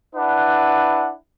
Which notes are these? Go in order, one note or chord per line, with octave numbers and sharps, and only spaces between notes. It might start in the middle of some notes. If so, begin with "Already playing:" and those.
D4 E4 B4 F#5